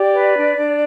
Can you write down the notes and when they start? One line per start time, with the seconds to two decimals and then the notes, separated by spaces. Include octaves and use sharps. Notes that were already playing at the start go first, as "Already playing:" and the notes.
Already playing: G4 D5
0.13 B4
0.36 D4
0.57 D4